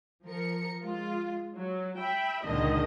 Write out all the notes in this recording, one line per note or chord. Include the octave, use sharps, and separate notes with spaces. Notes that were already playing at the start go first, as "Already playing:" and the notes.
F3 A#4 C#7
G#3 F4
F#3
E5 G5 B5
C#2 A#2 D3 D#3 G#3 D#5